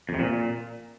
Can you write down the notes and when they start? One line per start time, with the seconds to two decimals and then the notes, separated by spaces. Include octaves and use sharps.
0.09 F2
0.14 C3
0.19 A#2